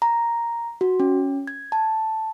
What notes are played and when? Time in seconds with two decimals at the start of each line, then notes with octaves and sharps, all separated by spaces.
0.02 A#5
0.81 F#4
1.00 C#4
1.47 G#6
1.72 A5